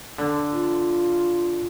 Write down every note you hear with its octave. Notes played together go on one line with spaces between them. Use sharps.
D3 A4
F4